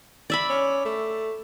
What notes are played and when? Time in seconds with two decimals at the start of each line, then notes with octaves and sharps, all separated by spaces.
0.30 D5 E5 B5
0.50 C#4
0.85 A3